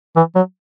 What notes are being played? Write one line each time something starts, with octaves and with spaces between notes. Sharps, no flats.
E3
F#3